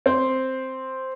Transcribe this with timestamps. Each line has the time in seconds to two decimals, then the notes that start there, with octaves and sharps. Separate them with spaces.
0.06 C4 C5